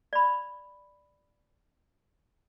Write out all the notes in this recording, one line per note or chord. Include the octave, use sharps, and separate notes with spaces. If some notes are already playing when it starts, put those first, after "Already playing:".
D5 B5